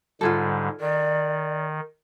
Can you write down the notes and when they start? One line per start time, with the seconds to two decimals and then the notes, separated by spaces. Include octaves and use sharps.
0.21 G#2 D3 G3 F4 G#4 A4
0.81 D#3 D5